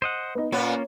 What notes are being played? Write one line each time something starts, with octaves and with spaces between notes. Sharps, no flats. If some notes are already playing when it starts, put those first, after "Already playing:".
C5 D#5 F#5
B3 D#4
A#2 A#3 B3 C#4 F4 B4 C#5